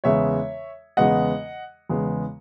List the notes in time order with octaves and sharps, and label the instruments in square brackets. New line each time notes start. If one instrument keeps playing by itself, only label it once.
[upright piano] E2 C#3 G#3 B3 C#5 E5
E2 C#3 G#3 B3 D#5 F#5
E2 C#3 G#3 B3